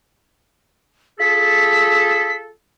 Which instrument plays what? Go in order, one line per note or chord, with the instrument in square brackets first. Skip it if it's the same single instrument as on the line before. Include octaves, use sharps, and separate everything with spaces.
[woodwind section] F4 G#4 A4 [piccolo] B6